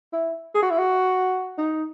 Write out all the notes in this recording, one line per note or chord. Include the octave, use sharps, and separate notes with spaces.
E4
G#4
F#4
E4
F#4
D#4